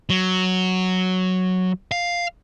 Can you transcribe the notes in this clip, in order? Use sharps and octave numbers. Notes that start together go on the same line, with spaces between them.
F#3
F5